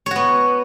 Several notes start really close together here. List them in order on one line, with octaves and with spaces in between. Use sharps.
C#5 F#4 B3